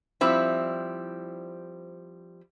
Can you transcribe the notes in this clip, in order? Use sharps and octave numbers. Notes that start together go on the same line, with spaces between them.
F3 G3 C4 E4